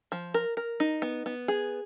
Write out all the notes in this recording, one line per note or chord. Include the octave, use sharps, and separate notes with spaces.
F3
A#4
A#4
D#4
B3
B3
G#4